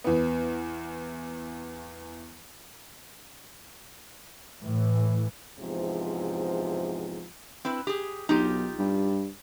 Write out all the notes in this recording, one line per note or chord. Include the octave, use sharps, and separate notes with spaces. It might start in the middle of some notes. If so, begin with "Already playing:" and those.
E2 B3
A2 E3
E2 G#2 C3 F3
C4 E4 B4
G4 G#4
B1 D#4 F4 G4
G2